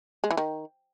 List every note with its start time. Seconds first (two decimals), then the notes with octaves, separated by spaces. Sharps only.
0.24 G#3
0.31 E3
0.37 D#3